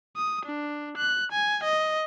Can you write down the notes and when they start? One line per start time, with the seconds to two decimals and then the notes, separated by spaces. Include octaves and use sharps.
0.16 D#6
0.46 D4
0.98 F#6
1.32 G#5
1.64 D#5